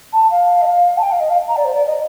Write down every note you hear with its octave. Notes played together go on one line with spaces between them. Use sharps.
A5
F5
D#5
F5
A5
G5
F5
D#5
F5
A#5
D5
C5
D5
D#5